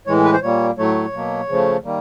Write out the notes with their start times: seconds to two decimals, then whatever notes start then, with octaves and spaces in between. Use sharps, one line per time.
0.07 A2 E3 G#3 C#5
0.25 B4
0.33 C5
0.42 A#2 G3 A#3 C#5
0.78 A2 F#3 A3 C#5
1.13 B2 F#3 A#3
1.49 C#3 F3 A3
1.84 D#3 G3 A#3